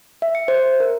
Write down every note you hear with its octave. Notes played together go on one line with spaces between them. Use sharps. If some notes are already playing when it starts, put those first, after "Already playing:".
E5
C#7
C5
A#4